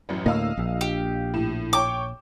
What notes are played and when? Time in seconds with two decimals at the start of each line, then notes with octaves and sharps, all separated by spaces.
0.09 A1 F#2
0.26 D2 A2 A#3 D#5 F5 E6
0.57 A#1
0.81 G4
1.34 A2 E7
1.73 C#5 G5 C#6 D6